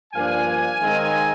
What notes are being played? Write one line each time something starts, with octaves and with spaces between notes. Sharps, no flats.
G2 F3 A#3 D4 F5 G#5
D#3 G#3 C4 D#4